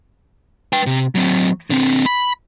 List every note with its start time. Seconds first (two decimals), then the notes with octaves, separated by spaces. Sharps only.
0.73 B4 G5
0.86 C3
1.15 F#3 C4
1.70 D3 C4
2.06 B5